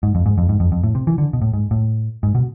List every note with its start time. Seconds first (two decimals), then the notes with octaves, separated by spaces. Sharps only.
0.03 G#2
0.15 F2
0.26 G#2
0.38 F2
0.49 G#2
0.60 F2
0.72 F2
0.83 A2
0.95 C3
1.07 E3
1.18 D3
1.33 B2
1.42 A2
1.54 G#2
1.71 A2
2.23 G#2
2.35 B2